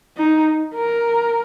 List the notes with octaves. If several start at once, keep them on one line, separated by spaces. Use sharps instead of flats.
D#4
A#4